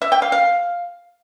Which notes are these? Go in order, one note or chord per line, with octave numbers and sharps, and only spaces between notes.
E5
G5
F5
F5